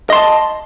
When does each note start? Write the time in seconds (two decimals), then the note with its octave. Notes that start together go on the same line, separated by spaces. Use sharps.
0.10 D#5
0.13 C6
0.15 A5